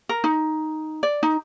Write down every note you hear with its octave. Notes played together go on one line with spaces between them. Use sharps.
A#4
D#4
D5
D#4